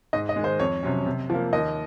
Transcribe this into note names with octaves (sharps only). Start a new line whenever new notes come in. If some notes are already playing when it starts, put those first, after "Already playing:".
G#2 D#5
D#5
D#3 G#3
C5
F2 C#5
C3 F#3 C#4
C3
F3 A#3
D#2 D#5